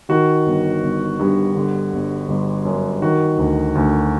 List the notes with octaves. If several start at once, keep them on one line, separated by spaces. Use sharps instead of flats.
D#3 F#4
G1
G1
G2
D3
G1
G1
F#2
D#3 F#4
D2
D2